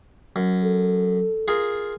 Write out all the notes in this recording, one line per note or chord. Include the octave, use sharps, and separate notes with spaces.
F#2
A4
F4 G#4 A#4